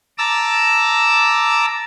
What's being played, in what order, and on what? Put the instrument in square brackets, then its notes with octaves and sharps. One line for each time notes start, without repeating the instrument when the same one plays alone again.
[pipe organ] A5 A#5 D6 E6